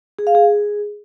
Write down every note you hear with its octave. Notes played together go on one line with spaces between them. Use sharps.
G#4
F5
G#4